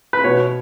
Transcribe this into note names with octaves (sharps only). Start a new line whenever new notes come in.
B4
B2 C#5